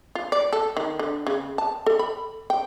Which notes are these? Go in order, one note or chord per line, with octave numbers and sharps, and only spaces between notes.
F4
D5
A4
D#3
D3
C#3
A5
A4
B5
G5